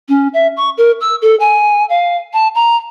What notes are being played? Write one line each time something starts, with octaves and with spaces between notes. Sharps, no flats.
C#4
E5
C#6
A#4
E6
A4
G#5
F5
A5
A#5